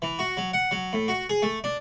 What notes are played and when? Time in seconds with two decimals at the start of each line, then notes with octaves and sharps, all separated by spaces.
0.02 E3
0.19 F#4
0.37 F#3
0.53 F#5
0.71 F#3
0.93 A2
1.08 F#4
1.29 G#4
1.42 A3
1.64 D4